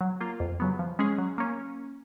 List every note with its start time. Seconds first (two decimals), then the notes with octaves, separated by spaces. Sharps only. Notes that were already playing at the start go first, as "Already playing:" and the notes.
0.01 F#3
0.21 A#3 F4
0.40 F2
0.60 C#3 F#3 B3
0.79 F3
0.99 G#3 C#4 G#4
1.18 F#3
1.38 A#3 C#4